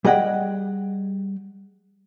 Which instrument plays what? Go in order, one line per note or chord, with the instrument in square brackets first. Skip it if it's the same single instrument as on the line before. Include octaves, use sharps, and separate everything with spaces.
[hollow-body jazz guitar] G3 G#4 D#5 F#5 G5